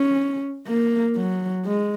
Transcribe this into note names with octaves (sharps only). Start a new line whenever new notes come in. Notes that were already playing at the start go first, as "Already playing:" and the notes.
Already playing: C#4
A#3
F#3
G#3